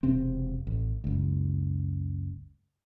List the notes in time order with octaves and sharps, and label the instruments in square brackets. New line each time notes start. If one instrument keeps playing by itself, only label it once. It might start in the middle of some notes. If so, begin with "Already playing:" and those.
[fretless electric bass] E1 C3 C4
A1
F#1 C#2